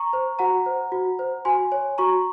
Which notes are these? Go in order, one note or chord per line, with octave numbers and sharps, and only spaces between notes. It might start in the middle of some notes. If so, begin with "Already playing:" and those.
Already playing: A#5 C#6
C5
F#4 F#5 A#5
C5
F#4
C5
F#4 G#5 C6
C#5
F#4 A#5 C#6